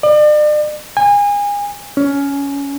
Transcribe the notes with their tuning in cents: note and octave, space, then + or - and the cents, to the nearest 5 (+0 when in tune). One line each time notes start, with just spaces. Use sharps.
D5 +40
G#5 -30
C#4 +15